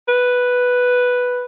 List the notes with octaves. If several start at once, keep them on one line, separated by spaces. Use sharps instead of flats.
B4